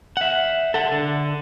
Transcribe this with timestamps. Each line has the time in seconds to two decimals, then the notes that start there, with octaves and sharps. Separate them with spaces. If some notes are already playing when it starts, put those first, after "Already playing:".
0.17 E5 F#5
0.74 A4 F#5
0.92 D3